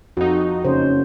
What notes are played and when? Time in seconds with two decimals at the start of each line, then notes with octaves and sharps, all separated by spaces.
0.17 F2 D#4 F#4
0.65 F#1 C#3 C#4 C5